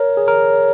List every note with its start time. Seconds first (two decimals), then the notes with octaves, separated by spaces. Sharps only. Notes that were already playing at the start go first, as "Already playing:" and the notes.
Already playing: A#4 C#5
0.17 G#4
0.28 A#4